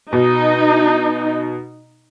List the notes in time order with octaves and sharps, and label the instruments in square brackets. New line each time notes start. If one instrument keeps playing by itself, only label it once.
[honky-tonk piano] B2 [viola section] D#4